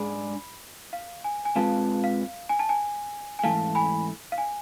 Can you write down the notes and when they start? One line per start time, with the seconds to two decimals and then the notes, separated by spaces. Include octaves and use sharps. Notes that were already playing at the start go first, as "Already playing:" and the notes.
Already playing: G#2 G#3 D4 G#4 B5
0.93 F5
1.24 G#5
1.45 G#5
1.56 B2 G#3 C4 F4 B4 F5 A5
2.04 F5
2.49 G#5
2.59 A5
2.69 G#5
3.39 G#5
3.43 G#2 E3 A3 F5 A5
3.75 G#5 B5
4.32 F5
4.38 G#5